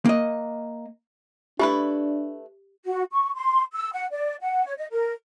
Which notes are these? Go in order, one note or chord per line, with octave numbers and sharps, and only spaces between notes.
A#3 D#5
A3 D4 E4 G4 B4
F#4
C#6
C6
E6
F#5
D5
F#5
C#5
D#5
A#4